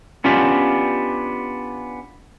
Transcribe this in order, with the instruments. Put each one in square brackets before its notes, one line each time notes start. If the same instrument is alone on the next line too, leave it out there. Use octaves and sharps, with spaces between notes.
[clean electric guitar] B3 C#4 D4 F4 G4